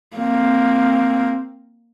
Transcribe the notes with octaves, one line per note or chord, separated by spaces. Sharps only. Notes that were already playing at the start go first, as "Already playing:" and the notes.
A#3 C4